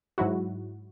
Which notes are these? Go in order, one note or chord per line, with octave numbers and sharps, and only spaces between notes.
G#2 F#3 E4 F#4